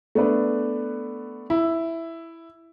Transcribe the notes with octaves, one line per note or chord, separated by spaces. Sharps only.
A3 B3 D4 B4
E4